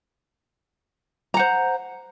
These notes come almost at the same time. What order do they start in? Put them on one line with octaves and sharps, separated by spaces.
A#5 F#5 C5